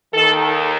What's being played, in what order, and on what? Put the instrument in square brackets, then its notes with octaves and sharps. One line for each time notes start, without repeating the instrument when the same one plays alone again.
[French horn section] D#2 D#3 A4